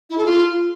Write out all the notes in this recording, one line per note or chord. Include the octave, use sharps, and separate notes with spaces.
E4
A4
F4